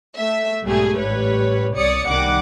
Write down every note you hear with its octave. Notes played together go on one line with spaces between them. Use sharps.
A3 E5
B1 G#2 G3 A3 G4 G#4
A1 G3 B4 C#5
C2 C#5 D5 D#6 C#7
C2 D#3 G3 F#5 D6